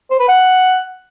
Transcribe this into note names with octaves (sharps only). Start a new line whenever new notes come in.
C5
B4
F#5